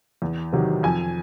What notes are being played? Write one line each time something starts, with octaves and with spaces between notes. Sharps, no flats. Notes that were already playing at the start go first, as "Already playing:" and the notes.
E2
C3 D#3 F#3
F2 G#5